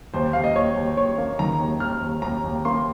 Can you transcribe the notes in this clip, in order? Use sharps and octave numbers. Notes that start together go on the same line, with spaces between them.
D#2 C5
D#2 F5
D#5
D#2 C#5
D#2
D#2 C#5
A#3
D#3 A#5
D#2
D#2 F6
D#2
D#2 A#5
D#2
A#3 C6